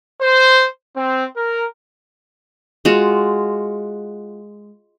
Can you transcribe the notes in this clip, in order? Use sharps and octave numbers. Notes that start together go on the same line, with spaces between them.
C5
C4
A#4
G#3 F4 F#4